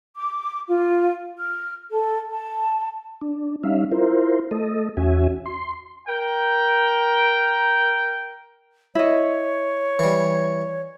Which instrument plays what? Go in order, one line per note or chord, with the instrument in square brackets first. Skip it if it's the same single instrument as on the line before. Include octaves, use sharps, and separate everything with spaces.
[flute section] D6
F4
F6
A4
A5
[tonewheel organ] D4
G3 C#4 D#4 E5 F5
E4 F4 A#4 C5
A3 A4 D#5
E2 C#4 F#4 E5 G#5
C6
[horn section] A#4 G5
[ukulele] E4 D#5 [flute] C#5
[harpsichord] E3 G3